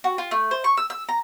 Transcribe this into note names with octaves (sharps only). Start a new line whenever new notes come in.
F#4
F4
A3
C5
C#6
E6
E6
A#5